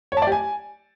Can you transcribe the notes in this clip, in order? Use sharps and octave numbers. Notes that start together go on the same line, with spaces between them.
C#5
A5
D5
G4
G#5